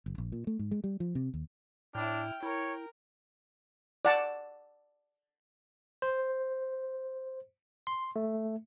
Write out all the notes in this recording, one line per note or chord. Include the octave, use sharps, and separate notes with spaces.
F#1
A#1
A#2
A3
G#2
G#3
G3
F3
C3
D#2
A2 D4 E4 G5 F6
E4 A#4 C#5
D5 F#5 A5
C5
C6
A3